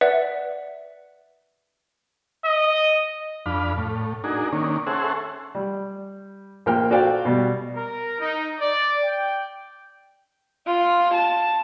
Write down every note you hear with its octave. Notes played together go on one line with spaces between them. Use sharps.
B4 D5 E5 F#5
D#5
F2 D4 F5 B5
A2
D4 D#4 F#4 G#4 A#4
D#3 A#3 C#4 D4
C#4 G#4 A4 C5 E5 F#5
G3
A#1 A#4 G5 F6
F#4 A4 C5 D5 F5 G5
B2 G3
A#4
D#4
D5
G5
F4
A5